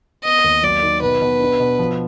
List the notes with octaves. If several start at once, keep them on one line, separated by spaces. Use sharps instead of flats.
B3 D#5
D#2
F#3 D5
D#3
B2 B4
B2
D4
B2
F3